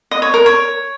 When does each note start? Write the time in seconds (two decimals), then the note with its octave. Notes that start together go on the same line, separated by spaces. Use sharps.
0.11 D#5
0.22 C#5
0.34 A#4
0.46 C#5